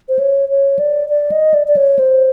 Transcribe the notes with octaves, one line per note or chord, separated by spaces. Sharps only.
C5
C#5
C#5
D5
D5
D#5
D5
D5
C#5
C5